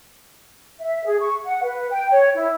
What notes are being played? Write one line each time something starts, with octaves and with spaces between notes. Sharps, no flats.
E5
G#4
C#6
F#5
B4
G5
C#5
E4